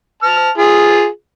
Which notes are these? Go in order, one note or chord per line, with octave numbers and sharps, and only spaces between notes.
A5 F6
F4 G#4